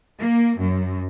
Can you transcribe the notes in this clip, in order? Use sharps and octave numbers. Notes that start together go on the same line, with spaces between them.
A#3
F#2